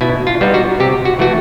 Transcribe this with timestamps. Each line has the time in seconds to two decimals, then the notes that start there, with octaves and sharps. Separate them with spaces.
0.01 B2 E4
0.27 F4
0.41 G3 B3 D#4
0.54 F#4
0.80 C3 G4
1.05 F#4
1.19 E3 A3 F#4